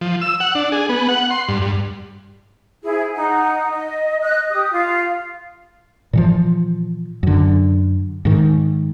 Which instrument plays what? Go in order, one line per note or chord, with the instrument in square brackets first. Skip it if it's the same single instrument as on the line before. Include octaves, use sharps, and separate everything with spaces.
[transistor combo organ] F3
E6
F#5
D4
G#4
B3
F#5
C6
G2
G2
[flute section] E4 G#4 C5
D#4 F#5
D#5
D#5 F#6
G4 D#6
F4 F5
[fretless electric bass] A#2 E3 F3
F#2 D3
G#2 D#3